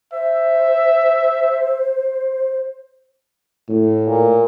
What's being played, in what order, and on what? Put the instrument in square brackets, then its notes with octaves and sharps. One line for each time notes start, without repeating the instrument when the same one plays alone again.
[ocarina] C5 [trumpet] E5
[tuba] A2
[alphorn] A#2